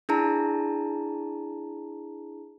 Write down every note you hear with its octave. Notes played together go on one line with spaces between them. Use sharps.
D4 E4 G#4 A5 A#5